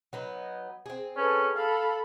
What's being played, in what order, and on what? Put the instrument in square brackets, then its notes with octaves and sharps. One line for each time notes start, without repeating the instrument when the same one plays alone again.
[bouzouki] F#3 B3 D#4
C4 G#4
[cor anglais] C#4 [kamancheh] A4 B4
[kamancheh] A4 B5 [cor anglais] F5